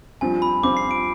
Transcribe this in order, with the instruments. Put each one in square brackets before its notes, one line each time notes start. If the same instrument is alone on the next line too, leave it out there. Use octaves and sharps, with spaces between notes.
[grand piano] G2 F3 C4 F4 [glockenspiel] G#5
[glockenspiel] B5
[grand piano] G2 F3 C4 F4 [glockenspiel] D6
[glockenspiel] C7
D7